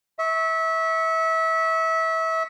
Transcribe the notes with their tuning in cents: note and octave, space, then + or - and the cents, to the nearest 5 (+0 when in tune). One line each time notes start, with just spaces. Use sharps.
E5 -25 C#6 -5